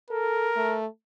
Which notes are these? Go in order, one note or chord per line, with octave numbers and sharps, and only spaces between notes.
A4 A#4
A3